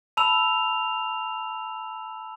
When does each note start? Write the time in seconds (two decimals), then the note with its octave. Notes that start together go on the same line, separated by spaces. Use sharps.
0.17 A5 B5 E6 F7